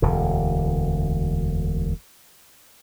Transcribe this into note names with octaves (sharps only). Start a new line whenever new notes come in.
E1 D2 D3